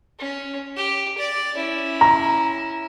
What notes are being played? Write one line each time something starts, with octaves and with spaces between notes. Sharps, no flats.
C#4
G4
D5
C#4 E4
A#5